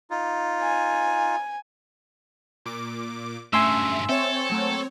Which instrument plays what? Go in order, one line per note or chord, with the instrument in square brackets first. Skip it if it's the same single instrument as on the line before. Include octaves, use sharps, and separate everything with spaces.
[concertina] D#4 F4
[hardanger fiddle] G#5
[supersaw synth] A#2 D6
[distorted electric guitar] G2 F#3 [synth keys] A3 C#4 [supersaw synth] E5 [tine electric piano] G#5 C6 E6
[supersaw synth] C4 C#5 [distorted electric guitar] A4 [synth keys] E5
[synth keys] F#3 A3 A#3